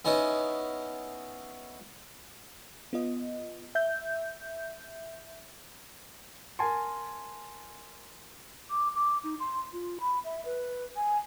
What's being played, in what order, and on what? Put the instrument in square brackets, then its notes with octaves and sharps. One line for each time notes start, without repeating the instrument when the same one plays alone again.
[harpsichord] B3 C#4 D#4 E4 C#5
[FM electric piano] B3 F4 D#5
E5 G6
[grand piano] A#4 G#5 A5 C6
[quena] D6
D6
D#4
C6
F4
B5
E5
B4
G#5